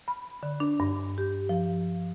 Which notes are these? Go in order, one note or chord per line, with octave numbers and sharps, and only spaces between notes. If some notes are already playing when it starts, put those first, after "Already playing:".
B5
D3
D4
G2
G4
F3